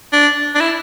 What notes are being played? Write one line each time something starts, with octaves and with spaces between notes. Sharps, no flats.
D4
D4
E4